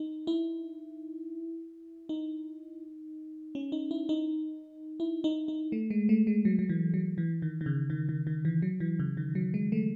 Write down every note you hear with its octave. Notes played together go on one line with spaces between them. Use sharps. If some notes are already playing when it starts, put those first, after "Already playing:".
Already playing: D#4
E4
D#4
C#4
D#4
E4
D#4
E4
D#4
D#4
A3
G#3
A3
G#3
F#3
F#3
E3
F#3
E3
D#3
D#3
C#3
D#3
D#3
D#3
E3
F#3
E3
C#3
D#3
F#3
G#3
A3